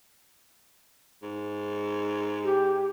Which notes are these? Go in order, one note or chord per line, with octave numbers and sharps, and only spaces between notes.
G#2
G4